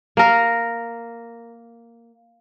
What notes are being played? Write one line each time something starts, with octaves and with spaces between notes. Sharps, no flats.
A#3 A#4